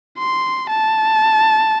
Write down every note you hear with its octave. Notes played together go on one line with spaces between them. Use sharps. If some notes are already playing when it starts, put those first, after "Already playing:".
C6
A5